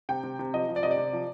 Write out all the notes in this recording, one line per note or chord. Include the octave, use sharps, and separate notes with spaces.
C3 G5
C3
C3
F3 D#5
F3
D5
C3 D#5
D5
C3
F3